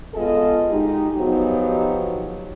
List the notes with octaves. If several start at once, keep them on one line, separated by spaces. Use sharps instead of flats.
G#3 B3 F4 G#4 A4 D#5
G#3 D#4 G4
F3 F#3 B3 D#4 F#4 G4